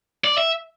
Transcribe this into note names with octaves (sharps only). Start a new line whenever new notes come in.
D5
E5